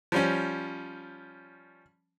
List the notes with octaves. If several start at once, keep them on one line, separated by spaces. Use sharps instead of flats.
F3 G3 C#4